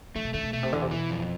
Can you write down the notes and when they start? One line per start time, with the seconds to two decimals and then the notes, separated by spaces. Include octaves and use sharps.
0.15 D3 A3
0.24 C3
0.34 D3 A3
0.43 C3
0.53 B2 A3
0.63 C3
0.72 E2 D3
0.82 C3
0.91 B2 E3
1.10 F2